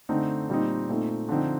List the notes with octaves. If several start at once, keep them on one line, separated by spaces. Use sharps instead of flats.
D3 A3 C4 D#4
A#2 G3 C4 D#4
A#2 A3 C4 D#4
D3 F3 C4 D#4